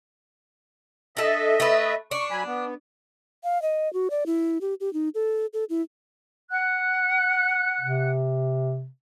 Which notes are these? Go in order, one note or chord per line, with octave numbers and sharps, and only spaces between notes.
D4 A4 D#5 E5
A3 B4
D4 C#6
F#3 G#5 B5
B3
F5
D#5
F#4
D5
E4
G4
G4
D#4
A4
A4
E4
F#5 F#6
C3